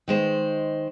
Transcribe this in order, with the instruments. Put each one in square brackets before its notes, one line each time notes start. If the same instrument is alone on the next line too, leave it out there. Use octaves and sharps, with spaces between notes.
[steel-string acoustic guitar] D#3 G#3 C5